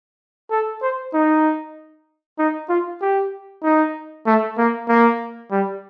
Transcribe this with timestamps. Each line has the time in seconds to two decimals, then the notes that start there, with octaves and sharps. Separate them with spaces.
0.51 A4
0.82 C5
1.14 D#4
2.39 D#4
2.69 F4
3.01 G4
3.63 D#4
4.26 A3
4.58 A#3
4.88 A#3
5.51 G3